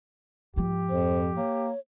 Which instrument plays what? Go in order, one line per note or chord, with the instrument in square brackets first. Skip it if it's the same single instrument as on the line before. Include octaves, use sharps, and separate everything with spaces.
[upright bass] G#2 F3 [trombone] G4
[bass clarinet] F2 [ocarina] C5
[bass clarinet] A#3 [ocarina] C#5